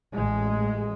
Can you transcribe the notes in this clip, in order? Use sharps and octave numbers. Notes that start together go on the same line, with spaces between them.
A1 G#3